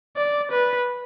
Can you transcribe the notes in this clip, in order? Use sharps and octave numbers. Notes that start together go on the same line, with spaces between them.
D5
B4